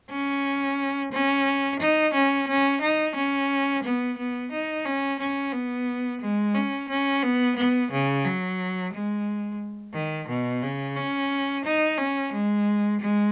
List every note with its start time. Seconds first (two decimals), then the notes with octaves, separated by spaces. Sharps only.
0.10 C#4
1.12 C#4
1.79 D#4
2.14 C#4
2.47 C#4
2.81 D#4
3.15 C#4
3.83 B3
4.17 B3
4.52 D#4
4.85 C#4
5.19 C#4
5.52 B3
6.21 G#3
6.55 C#4
6.89 C#4
7.23 B3
7.56 B3
7.91 C#3
8.24 F#3
8.93 G#3
9.94 D#3
10.28 B2
10.62 C#3
10.96 C#4
11.65 D#4
11.98 C#4
12.32 G#3
13.00 G#3